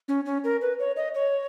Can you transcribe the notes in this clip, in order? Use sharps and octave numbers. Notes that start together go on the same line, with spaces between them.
C#4
C#4
A#4
B4
C#5
D#5
C#5